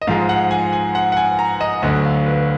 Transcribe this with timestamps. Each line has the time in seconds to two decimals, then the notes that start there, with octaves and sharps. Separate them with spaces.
0.02 D#5
0.07 G#2 F3 G#3 F5
0.29 F#5
0.51 G#5
0.73 G#5
0.95 F#5
1.12 F#5
1.17 G#5
1.39 A#5
1.61 D#5
1.82 D2 D3 F#3 D#5
2.04 F5
2.26 B4